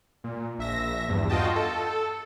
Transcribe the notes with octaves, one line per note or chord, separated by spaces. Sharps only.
A#2
A#1 E5 A#6
E2 G2
F4 F#4 D#5 G5 A5
A4